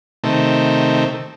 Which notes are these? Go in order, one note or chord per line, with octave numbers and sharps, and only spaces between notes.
C3 D#3 A3